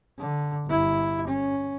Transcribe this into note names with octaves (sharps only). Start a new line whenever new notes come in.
D3
G1 E4
C#4